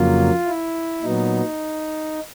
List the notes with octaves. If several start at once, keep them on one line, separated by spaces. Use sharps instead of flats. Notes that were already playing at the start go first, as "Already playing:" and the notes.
Already playing: F2 C#3 F#3 A#3 F4
E4
A#2 F#3 B3 D#4